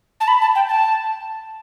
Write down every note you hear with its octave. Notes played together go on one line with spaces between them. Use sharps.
A5
B5
A5
G5
A5